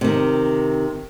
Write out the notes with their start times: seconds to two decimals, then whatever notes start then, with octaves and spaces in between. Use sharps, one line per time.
0.01 C3 D#3